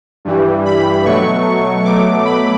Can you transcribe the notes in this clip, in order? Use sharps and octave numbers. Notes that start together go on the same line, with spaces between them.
G2 E3 G3
B5
B2 F#3 A3 C#6
B2 F#3 A3 D6
B5